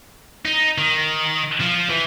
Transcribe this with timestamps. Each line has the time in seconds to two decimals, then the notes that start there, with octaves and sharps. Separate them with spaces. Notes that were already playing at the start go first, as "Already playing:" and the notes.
0.45 D#4
0.78 D#3
1.60 F3
1.90 E3